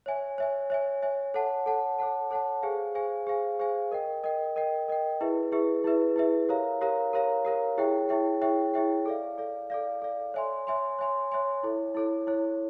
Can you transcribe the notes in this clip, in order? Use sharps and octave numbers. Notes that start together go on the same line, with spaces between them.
C#5 E5 G#5
C#5 E5 G#5
C#5 E5 G#5
C#5 E5 G#5
A4 C#5 F#5 A5
A4 C#5 F#5 A5
A4 C#5 F#5 A5
A4 C#5 F#5 A5
G#4 C5 F5 G#5
G#4 C5 F5 G#5
G#4 C5 F5 G#5
G#4 C5 F5 G#5
A#4 D#5 G5
A#4 D#5 G5
A#4 D#5 G5
A#4 D#5 G5
E4 G#4 B4 E5
E4 G#4 B4 E5
E4 G#4 B4 E5
E4 G#4 B4 E5
G4 A#4 C#5 F5 A#5
G4 A#4 C#5 F5 A#5
G4 A#4 C#5 F5 A#5
G4 A#4 C#5 F5 A#5
E4 G#4 C#5 E5 G5
E4 G#4 C#5 E5 G5
E4 G#4 C#5 E5 G5
E4 G#4 C#5 E5 G5
A4 D5 F5
A4 D5 F5
A4 D5 F5
A4 D5 F5
C#5 E5 G#5 C6
C#5 E5 G#5 C6
C#5 E5 G#5 C6
C#5 E5 G#5 C6
E4 A4 C#5
E4 A4 C#5
E4 A4 C#5